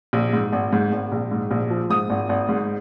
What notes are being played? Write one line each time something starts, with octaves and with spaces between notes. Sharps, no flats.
A#1
G#2
G#1
G#2
G#1
A#1
G#2
A#1
F3
G#2 D#6
G#1
G#1
G#2